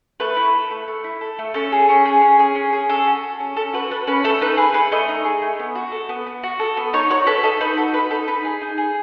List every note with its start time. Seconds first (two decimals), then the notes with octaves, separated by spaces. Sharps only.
0.20 A3 B4
0.37 E4
0.55 A4
0.71 A3
0.88 A3
1.04 E4
1.21 A4
1.39 A3
1.54 C#4 A4
1.72 G#4
1.89 C#4
2.06 G#4
2.22 C#4
2.39 G#4
2.55 C#4
2.73 G#4
2.89 C#4 A4
3.07 F#4
3.24 A4
3.40 C#4
3.57 C#4 A4
3.74 F#4 B4
3.91 A4 B4
4.07 C#4 B4
4.24 A3 A4
4.41 D#4 B4
4.57 G#4 B4
4.74 A3 B4
4.92 A3 D#5
5.09 D#4
5.25 G#4
5.42 A3
5.59 B3
5.75 F#4
5.92 A4
6.09 B3
6.27 B3
6.43 F#4
6.59 A4
6.77 B3
6.93 D#4 C#5
7.10 F#4 C#5
7.27 A4 B4
7.43 D#4 A4
7.60 D#4 B4
7.77 F#4 A4
7.94 A4 B4
8.11 D#4 A4
8.28 D#4 B4
8.45 G#4
8.62 D#4
8.78 G#4